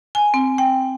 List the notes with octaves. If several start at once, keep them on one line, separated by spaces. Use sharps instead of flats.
G#5
C4
G5